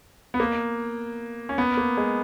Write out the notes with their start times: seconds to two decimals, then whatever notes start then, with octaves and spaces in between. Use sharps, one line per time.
0.34 B3
0.40 A#3
1.49 C#4
1.58 B3
1.77 A#3
1.97 G#3